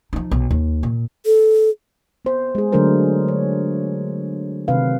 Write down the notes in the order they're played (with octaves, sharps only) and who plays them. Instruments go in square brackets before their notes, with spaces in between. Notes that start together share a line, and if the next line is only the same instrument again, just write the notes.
[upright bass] F3 D#4
B1
D#2
A#2
[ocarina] A4
[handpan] B3 C5
G#3 G#4
D3 F#3 A3 D4 A#4 C5
C#5
C3 D#3 B4 F5